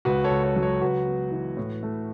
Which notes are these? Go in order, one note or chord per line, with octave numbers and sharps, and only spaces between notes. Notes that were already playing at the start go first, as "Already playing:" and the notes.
C#2 F#4 B4
A4 C#5
C#2
A4 C#5
F#3
A4 C#5
C#2 F#4 B4
B3
E3
A2
A3